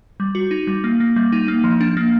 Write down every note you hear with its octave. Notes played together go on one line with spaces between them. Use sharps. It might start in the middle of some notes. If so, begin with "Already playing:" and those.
G3
F#4
D#4
G3
A#3
A#3
G3
D#4
A#3
F3
D4
A#3